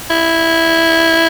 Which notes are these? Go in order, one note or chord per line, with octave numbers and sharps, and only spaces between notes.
E4